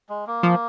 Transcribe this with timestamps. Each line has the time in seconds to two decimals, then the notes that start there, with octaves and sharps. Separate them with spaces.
0.09 G#3
0.27 A#3
0.43 F3